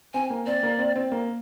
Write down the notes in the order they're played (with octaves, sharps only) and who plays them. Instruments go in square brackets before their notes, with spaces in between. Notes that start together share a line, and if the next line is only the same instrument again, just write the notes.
[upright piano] C4 [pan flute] G#5
[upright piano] A#3
[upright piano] C4 [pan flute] D5
[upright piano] A#3
C4
C4
A#3